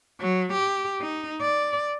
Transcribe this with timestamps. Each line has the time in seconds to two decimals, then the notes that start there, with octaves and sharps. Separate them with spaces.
0.20 F#3
0.53 G4
1.01 D#4
1.41 D5